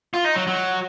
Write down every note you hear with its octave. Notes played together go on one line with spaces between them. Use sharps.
F4
D#4
F#3
F#3